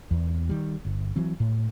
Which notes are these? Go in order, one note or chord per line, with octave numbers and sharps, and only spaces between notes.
E2
D#3 G3
G1
E3 F#3 C4
A2